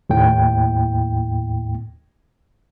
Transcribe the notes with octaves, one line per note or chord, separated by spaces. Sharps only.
D#2 A2 G5